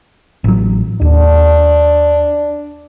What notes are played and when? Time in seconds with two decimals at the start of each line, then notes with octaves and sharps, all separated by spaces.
0.44 A1 F#3
1.01 D#2 D4